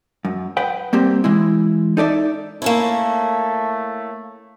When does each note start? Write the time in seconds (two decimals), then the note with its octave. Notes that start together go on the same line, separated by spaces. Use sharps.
0.25 F#2
0.57 B4 F#5 G5
0.93 G3 A#3 C4 G4
1.24 E3 G#3 E4
1.97 D#4 A4 D5 E5
2.62 A3 A#3 C#4 E4